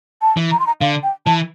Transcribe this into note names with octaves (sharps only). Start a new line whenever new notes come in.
A5
E3
A#5
C6
A#5
D3 F5
G5
E3 A5